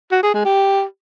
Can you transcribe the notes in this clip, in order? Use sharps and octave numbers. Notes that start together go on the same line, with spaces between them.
F#4
G#4
G#3
G4